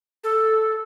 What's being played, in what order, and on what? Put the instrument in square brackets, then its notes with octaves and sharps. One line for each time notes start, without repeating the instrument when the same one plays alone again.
[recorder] A4